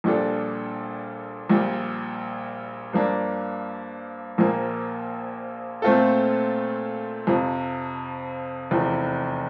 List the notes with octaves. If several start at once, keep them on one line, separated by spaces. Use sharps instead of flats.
A#1 A#2 G3 D4 A4
A#1 A#2 G3
G2 F3 A#3 D4
A#1 A#2 F3 A#3
A#2 A3 C4 F4 A4
F2 C3 F3
F1 E2 C3 F3